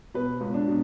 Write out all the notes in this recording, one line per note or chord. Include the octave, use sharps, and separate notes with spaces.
B2 B4
C#2
D4
B2